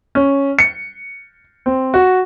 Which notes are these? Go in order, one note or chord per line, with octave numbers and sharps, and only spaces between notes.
C#4
C#7
C4
F#4